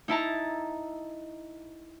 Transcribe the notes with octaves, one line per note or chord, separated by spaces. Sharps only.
D#4 E4 A5 A#5